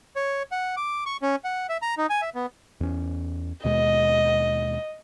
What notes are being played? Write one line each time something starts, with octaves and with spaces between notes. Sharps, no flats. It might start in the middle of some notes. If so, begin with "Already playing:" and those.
C#5
F#5
D6
C#6
C#4
F#5
E5
A#5
D#4
G#5
E5
B3
E2 C#4
D#2 B2 G#3 D#5